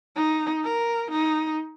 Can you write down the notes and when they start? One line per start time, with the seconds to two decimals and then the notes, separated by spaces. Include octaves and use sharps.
0.15 D#4
0.63 A#4
1.11 D#4